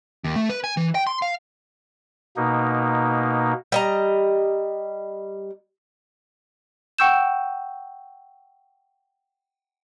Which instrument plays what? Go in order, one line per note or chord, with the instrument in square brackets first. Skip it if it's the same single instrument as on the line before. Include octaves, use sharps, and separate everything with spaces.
[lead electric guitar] D#2
A3
B4
G#5
E3
G5
C6
F5
[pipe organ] B2 A#3 D#4
[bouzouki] G3 D#5 A#5
[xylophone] F#5 G5 C#6 E6 G6 E7